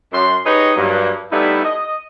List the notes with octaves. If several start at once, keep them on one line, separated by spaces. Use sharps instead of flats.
F#2 C6
D#4 G4 G#4 B4 C#5 D#5
G2 F#3 A#3
G3 A3 B3 D#4 E4
D#5